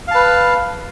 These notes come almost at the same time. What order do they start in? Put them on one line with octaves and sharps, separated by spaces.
F5 A5 B4